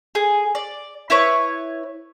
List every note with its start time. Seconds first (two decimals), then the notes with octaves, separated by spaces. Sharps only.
0.15 G#4
0.55 D5
1.10 E4 B4 C#5